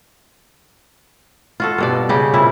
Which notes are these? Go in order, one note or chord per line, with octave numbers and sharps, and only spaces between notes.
F4 F#4 A4
G2 B2 D5
C#3 G4
A#2 G3 C4 E4